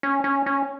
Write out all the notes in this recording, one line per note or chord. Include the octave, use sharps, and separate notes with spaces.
C#4
C#4
C#4